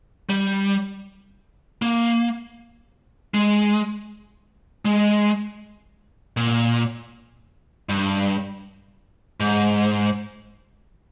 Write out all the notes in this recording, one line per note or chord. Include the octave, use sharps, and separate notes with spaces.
G3
A#3
G#3
G#3
A#2
G2
G#2